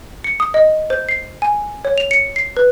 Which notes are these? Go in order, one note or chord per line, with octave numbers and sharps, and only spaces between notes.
C#7
D#6
D#5
C5
C7
G#5
C#5
F7
C#7
C7
B4